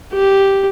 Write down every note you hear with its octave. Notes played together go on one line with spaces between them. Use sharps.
G4